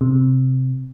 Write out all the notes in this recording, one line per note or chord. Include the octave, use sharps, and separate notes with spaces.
C3